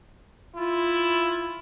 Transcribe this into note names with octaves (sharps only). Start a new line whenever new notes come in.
E4 F4